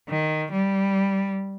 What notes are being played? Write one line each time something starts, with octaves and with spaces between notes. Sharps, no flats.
D#3
G3